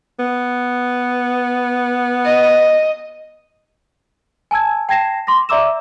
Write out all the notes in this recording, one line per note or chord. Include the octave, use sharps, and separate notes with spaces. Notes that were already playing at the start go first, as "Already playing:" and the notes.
B3
D#5
G#5 A5 E6 G#6
G5 A5 G#6 A#6 C7 E7
C6 D6 A#6
D5 E5 A#5 D6 E6 E7